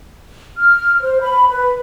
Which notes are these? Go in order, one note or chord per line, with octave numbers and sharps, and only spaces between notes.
F6
C5
B5
B4